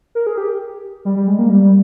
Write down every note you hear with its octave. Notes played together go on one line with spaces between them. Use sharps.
A#4
G#4
G4
G3
G3
G#3
A#3
G3